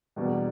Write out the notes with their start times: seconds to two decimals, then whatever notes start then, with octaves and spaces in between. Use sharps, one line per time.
0.16 E2 B2 G3 A#3 D4